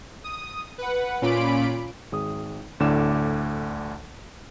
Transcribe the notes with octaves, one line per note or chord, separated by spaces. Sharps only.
D#6
B4 F#5
A#2 C#4 F4 B5 D6 D7
G#1 G#4 D#6
D2 A2 D3 D5 D6 E7